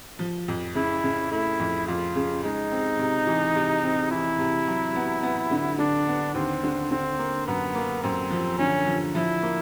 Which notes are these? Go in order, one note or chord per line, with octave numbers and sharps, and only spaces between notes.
F3
F2
C#3 E4
C#3
A3 E4
F2
F2 F4
C#3
G#3 D#4
C4
C3
E3
C3
C4
E3 E4
C3
F#3
B3
B3
D3
D3 D4
B3
D#2 C4
D3
D3 C4
A#3
F#2 B3
A#3
F#2 C4
F3
D3 C#4
F3
F3 E4
A#3